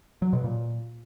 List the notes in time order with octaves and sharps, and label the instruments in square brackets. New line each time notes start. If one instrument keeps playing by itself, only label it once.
[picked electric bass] F#3
B2
A#2